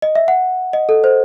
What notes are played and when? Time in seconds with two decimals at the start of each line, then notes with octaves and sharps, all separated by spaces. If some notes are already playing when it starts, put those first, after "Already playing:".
0.02 D#5
0.15 E5
0.28 F#5
0.73 D#5
0.89 A4
1.04 C5